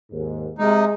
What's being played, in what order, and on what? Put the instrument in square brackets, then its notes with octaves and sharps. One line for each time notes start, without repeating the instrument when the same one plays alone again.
[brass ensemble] D#2 G#2
[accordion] C3 D#4 [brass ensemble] G#3